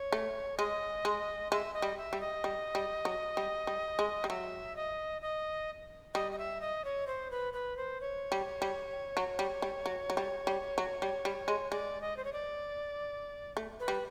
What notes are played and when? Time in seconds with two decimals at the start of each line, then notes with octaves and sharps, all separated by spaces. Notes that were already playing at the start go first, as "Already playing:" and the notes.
Already playing: C#5
0.12 A3
0.58 G#3 D#5
1.05 G#3
1.51 G#3 E5
1.74 D#5
1.82 G3
1.98 E5
2.13 G3
2.20 D#5
2.44 G3
2.75 G3
3.05 F#3
3.37 G3
3.67 G3
3.99 G#3
4.24 G3
4.29 F#3 E5
4.76 D#5
5.22 D#5
6.14 G3 D#5
6.32 D#5
6.38 E5
6.61 D#5
6.85 C#5
7.07 C5
7.31 B4
7.53 B4
7.77 C5
8.01 C#5
8.32 G3
8.62 G3
9.17 F#3
9.39 G3
9.62 G3
9.86 F#3
10.10 F#3
10.17 G3
10.47 G3
10.78 F#3
11.02 G3
11.25 G3
11.48 G#3
11.71 G#3 D5
12.01 D#5
12.17 C5
12.24 C#5
12.33 D5
13.57 A3
13.80 B4
13.88 G3